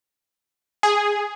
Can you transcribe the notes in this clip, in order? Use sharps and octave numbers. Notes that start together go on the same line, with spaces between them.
G#4